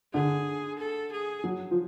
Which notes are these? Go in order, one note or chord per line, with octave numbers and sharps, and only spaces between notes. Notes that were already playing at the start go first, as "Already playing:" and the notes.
D3 G#4
A4
G#4
F#3
F3